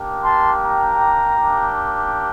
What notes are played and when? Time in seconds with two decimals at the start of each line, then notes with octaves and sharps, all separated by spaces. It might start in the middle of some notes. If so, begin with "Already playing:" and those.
Already playing: A#3 D4 G4
0.22 A5 C6
0.61 G5 A#5
1.38 A#3 D4 G4